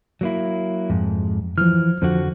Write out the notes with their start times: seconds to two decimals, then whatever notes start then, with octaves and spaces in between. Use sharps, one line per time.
0.21 F#3 A#3 E4
0.90 F2 G#2
1.58 E3 F3 F6
2.02 F2 D3 F3 F#4